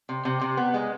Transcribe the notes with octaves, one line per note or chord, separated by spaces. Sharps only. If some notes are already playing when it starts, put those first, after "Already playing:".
C3
C3
C3
B3
G#3